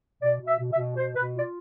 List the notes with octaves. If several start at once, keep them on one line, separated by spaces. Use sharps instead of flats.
B2 D5
B2
E5
B2
E5
B2
B2 C5
B2 B4
F4 D5